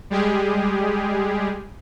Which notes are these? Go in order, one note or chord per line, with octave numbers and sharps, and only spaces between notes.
G3 G#3 G4 G#4